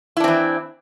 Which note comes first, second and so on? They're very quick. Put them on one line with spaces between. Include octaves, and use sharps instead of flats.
E4 D4 C4 E3